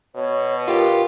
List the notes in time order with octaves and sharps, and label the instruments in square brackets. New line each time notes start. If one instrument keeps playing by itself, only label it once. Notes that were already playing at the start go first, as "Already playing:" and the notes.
[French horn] B2 [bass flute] C#5
[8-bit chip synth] F4 G4 [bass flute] A#4